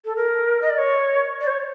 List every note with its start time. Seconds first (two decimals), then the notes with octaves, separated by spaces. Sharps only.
0.04 A4
0.16 A#4
0.61 D#5
0.69 D5
0.78 C#5
1.40 D5
1.46 C5
1.50 C#5